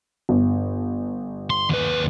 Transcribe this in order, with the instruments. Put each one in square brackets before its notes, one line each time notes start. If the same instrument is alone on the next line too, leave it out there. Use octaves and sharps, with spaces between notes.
[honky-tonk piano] G1
[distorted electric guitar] C6
D#2 B4